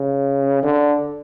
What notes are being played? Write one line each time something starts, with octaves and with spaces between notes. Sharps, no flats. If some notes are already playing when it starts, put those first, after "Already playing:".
Already playing: C#3
D3